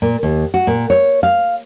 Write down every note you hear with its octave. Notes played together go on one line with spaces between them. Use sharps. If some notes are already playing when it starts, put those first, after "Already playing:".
A#2
D#2
F#4
A#2
C#5
F5